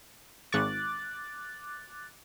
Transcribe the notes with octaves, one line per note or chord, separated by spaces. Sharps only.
G#1 C#6 D6 F#6 A6